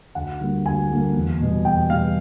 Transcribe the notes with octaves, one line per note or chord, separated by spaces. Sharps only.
D2 F#5
D3 G3 A#3
D2 G#5
D3 G3 A#3
E2
B2 G3 B3
E2 G5
B2 G3 B3 F5